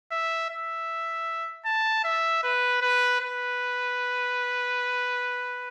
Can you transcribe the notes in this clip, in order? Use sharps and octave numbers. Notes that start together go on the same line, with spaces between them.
E5
E5
A5
E5
B4
B4
B4